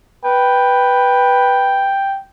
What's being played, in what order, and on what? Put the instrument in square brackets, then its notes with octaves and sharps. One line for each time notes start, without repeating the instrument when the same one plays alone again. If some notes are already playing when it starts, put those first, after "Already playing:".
[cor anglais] B4 [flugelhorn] G5